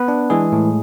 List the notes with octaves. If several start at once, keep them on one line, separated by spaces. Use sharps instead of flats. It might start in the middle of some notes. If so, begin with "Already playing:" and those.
Already playing: B3 B4
D4
E3 G#3 G#4
A2